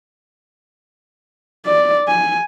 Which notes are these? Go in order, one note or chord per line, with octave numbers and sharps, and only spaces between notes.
D5
G#5